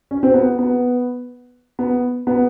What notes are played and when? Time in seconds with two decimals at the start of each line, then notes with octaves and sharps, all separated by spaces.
0.11 C#4
0.23 C4
0.34 B3
0.59 B3
1.79 B3
2.27 B3